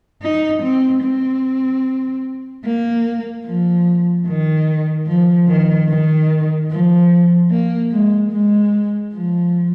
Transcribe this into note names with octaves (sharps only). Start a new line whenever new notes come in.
D#4
C4
C4
A#3
F3
D#3
F3
D#3
D#3
F3
A#3
G#3
G#3
F3